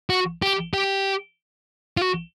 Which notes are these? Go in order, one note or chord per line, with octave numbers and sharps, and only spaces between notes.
F#4
G4
G4
F4
F#4